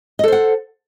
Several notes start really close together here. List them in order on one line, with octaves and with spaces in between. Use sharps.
D#5 A4 C5 F#5